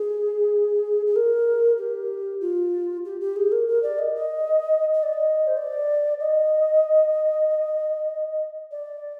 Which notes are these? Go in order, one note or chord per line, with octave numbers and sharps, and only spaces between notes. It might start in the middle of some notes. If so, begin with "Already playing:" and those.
Already playing: G#4
G#4
A#4
G4
F4
G4
G4
G#4
A#4
A#4
D5
D#5
D#5
D#5
D5
D#5
C5
D5
D#5
D5